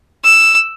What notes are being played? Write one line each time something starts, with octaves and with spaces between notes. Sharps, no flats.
E6